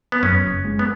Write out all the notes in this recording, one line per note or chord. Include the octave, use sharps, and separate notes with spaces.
B3
F#2 C#4
F#1
G#3
B3